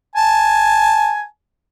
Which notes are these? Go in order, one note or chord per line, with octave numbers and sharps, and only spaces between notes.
G#5 A5